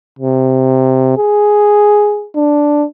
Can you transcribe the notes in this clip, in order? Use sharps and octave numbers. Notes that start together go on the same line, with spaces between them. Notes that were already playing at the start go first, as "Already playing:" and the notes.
C3
G#4
D4